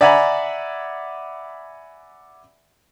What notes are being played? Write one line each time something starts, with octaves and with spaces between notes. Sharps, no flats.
D5 E5 F#5 G#5 A#5 B5